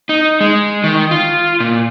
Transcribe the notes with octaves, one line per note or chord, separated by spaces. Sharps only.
D#4
G#3
D#3
F4
A#2